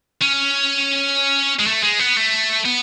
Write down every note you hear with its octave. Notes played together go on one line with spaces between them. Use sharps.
C#4
G#3
A3
G#3
B3
A3
B3